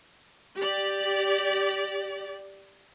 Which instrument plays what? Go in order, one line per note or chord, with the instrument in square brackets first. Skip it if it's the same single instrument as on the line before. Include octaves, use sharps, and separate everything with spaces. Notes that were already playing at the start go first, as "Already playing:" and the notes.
[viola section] G4 D5